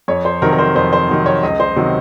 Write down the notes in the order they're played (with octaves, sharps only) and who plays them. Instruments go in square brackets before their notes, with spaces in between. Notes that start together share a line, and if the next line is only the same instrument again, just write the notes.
[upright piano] F2 C#5
C5
C3 D#3 F#3 A#4
A#4
C5
F2 C5
C5
C3 D#3 F#3
C#5
C#2 D#5
C5
C3 D#3 F#3 D#5